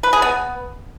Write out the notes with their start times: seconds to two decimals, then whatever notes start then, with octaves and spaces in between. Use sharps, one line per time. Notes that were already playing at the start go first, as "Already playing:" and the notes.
0.03 B4
0.13 G#4
0.22 B3